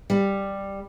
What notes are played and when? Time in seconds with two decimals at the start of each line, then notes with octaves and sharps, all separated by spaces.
0.10 G3